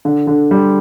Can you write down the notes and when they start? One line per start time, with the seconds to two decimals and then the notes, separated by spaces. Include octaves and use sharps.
0.05 D3
0.27 D3
0.51 G3